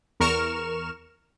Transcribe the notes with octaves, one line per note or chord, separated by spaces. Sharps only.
E2 A#4 C#6 F6 E7